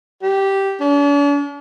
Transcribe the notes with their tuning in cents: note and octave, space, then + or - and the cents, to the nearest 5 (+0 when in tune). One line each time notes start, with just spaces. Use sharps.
G4 -10
D4 -45